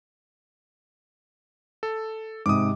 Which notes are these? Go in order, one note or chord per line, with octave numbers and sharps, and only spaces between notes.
A4
G#2 C3 D6 D#6